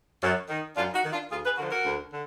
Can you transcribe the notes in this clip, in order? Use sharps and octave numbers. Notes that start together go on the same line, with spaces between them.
F#2
D#3
F#2 D4 F4
D#4 F#4
D#3
D4 F4
D2 F4 G#4
G#4 B4
D3 F3 F#4 A#4
F#4 A#4
D2
D3